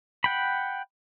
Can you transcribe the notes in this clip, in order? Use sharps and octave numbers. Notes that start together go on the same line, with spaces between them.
F#5 G5 B5